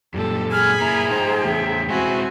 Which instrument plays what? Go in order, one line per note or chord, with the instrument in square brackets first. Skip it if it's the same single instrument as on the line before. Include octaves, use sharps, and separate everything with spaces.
[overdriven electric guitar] F#2 A#2 [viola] G3 A4
[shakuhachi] G#4 [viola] G#5 B5 [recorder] F6
[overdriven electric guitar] A#3 E4 [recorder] A#5
[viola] F3 G5 [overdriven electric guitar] D#4 C5
[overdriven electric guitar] E2 A3 [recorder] E5
[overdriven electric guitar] G#3 E4 [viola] C4 F#4 [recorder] G#5